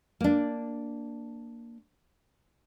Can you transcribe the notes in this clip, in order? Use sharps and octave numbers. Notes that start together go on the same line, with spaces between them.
A#3 D4